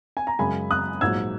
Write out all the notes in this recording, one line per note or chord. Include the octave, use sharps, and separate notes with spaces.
G#5
A#5
F#2 C#3 G#3 G#5 B5
D#6 F#6
A#1 G#2 F#3 E6 G#6